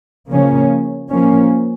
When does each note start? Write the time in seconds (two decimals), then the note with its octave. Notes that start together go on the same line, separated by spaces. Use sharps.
0.30 C#3 F3 A#3 C#4
1.10 F3 A#3 C#4